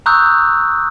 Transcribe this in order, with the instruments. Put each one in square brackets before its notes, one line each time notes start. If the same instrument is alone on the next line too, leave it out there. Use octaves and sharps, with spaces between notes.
[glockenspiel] A#5 C#6 D#6 E6 F#6 G6